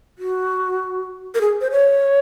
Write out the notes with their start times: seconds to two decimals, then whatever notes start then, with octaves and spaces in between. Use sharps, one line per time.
0.18 F#4
1.35 A#4
1.41 G#4
1.61 C5
1.71 C#5